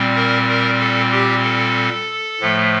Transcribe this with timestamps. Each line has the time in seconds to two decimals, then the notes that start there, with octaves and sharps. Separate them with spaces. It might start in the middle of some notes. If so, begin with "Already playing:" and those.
Already playing: A#2 G3 C4
0.16 A#4
0.48 A#4
0.80 A4
1.12 G4
1.44 A4
2.40 A2 F3 A3